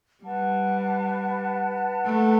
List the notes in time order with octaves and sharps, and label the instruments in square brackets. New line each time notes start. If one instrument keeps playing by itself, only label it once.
[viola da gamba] G3 [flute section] B4 F#5 A5
[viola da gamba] A3